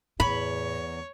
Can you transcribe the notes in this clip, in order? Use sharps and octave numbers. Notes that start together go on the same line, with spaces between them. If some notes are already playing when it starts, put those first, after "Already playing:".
E2 A2 C#5 B5